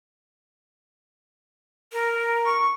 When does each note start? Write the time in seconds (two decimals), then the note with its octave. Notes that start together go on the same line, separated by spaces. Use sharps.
1.93 A#4
2.45 C#6